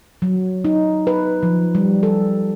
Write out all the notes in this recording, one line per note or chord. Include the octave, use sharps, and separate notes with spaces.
F#3
D#4
B4
F3
G3
A4